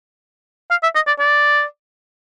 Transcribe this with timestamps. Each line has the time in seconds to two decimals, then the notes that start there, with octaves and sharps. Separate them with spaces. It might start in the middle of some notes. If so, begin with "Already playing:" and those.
0.70 F5
0.83 E5
0.95 D#5
1.07 D5
1.19 D5